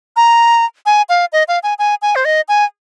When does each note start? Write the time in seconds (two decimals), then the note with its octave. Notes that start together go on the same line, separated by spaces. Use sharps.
0.16 A#5
0.86 G#5
1.09 F5
1.33 D#5
1.48 F5
1.63 G#5
1.79 G#5
2.02 G#5
2.16 C5
2.25 D#5
2.48 G#5